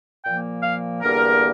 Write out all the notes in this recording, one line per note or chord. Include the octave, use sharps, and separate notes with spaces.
A#2 F3 A#3 G5
F5
E2 D3 G3 A#3 A#4